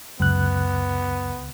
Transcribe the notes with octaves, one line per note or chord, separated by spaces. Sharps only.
C#2 F#2 B3 F#6